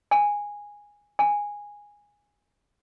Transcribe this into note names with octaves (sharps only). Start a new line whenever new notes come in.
G#5
G#5